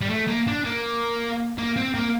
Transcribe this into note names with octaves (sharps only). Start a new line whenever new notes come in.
G3
A3
A#3
D4
A#3
A#3
C4
A#3